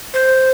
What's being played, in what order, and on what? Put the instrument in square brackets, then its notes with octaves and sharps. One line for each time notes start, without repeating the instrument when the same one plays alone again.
[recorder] C5